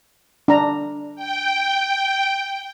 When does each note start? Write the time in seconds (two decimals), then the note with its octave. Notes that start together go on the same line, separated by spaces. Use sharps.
0.48 D4 A#5
1.16 G5